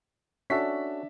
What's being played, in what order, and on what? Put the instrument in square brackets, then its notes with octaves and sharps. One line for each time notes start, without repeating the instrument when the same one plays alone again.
[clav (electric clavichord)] C#4 F#4 A4 [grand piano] D4 E5 B6